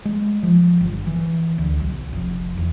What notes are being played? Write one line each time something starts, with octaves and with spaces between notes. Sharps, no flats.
G#3
F3
G1
E3
D2
B1
F1
E2